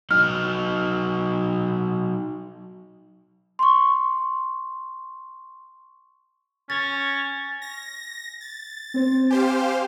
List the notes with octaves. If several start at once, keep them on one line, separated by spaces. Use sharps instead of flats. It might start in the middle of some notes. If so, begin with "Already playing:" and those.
F#3 D#4 F6
C6 C#6
C#4 A6
A#6
A6
C4 C5
G4 C5 F5 G#5